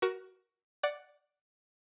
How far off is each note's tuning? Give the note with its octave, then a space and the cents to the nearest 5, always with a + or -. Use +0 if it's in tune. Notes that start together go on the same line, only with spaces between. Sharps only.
F#4 +15 A#4 +20
D5 +0 F#5 +0